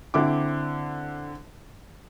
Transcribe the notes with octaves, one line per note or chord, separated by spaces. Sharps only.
D3 C4 E4 C5 D6